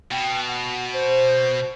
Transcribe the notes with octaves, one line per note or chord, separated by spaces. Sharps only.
B2 G5
F#5
C5